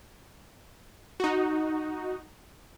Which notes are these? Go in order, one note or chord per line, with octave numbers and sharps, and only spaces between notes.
D#4 F#4